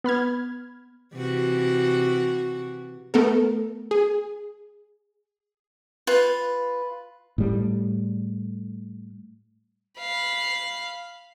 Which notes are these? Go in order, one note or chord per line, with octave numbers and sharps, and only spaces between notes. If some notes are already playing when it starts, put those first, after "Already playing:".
B3 B5 F6 G#6
C3 E3 F#4
A3 B3 A4 A#4
G#4
F4 B4
A2 G3
F5 B5